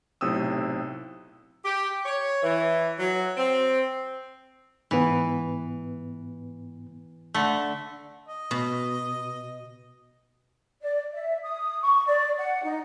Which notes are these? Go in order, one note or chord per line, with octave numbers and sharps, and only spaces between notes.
B1 A2 C3 G5 D#6 E6
G4
C#5
E3
F#3
C4
G#2 E3 B3
D3 A3
D#5
B2
D5
E5
D#6
C#6
D5
F#5
D#4